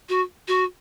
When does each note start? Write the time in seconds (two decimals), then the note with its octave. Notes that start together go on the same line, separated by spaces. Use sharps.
0.09 F#4
0.48 F#4